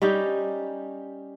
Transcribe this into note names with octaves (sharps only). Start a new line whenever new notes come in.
G3 C#4 D#4 G4